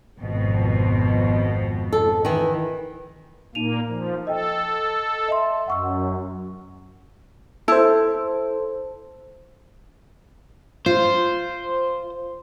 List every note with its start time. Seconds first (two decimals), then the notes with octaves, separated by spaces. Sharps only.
0.20 G#1 F2 B2
1.93 A4
2.25 D#3 E3
3.55 A#2 A#3 D#4 D#7 F7
3.89 F3
4.27 A4 D#5 G5
5.28 D#5 E5 C6
5.68 F#2 F#5 C#6 E6
7.68 E4 A4 C5
10.86 F4 C5